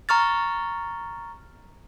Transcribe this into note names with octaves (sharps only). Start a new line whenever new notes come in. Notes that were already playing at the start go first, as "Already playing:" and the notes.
A#5 C#6 F6 A6